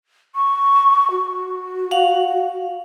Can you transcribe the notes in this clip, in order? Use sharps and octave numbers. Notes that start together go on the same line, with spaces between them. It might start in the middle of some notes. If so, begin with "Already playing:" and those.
C#6
F#4
F5 F#5